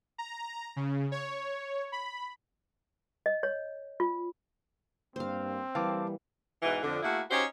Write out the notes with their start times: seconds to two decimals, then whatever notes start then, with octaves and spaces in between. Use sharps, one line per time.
0.18 A#5
0.76 C#3
1.12 C#5
1.92 B5
3.26 D#5
3.43 C#5
4.00 F4
5.16 G2 A#3 C4 C5 F5
5.75 E3 G3 A#3 F5 A5 D6
6.62 G#2 B2 E3
6.83 F2 D3
7.03 A3 A#3 E4 F#4 G#4
7.30 C#4 D#4 F#4 G4 C5